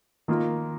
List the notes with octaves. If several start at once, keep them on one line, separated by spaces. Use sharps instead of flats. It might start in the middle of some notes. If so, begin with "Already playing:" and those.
D#3 A#3 F4 A#4